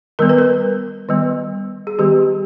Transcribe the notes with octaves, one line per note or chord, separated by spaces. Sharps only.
D#3 G3 B3 A#4
B4
A#4
D#3 G3 B3
G#4
D#3 G3 B3 G4